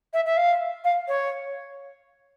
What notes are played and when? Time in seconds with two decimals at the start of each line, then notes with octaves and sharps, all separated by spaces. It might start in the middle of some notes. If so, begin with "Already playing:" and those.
0.13 E5
0.26 E5
0.37 F5
0.84 F5
1.08 C#5